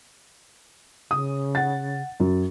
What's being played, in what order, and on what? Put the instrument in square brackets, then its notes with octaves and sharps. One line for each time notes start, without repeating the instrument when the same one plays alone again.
[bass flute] C#3 [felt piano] D#6
[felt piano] F#5 A6
F#2